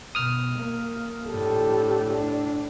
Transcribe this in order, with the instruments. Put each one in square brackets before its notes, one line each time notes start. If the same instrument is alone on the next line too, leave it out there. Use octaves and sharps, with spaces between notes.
[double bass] B2 [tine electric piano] D#6 F6
[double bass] A#3
[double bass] A2 D3 [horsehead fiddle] G4 A4
[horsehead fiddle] D4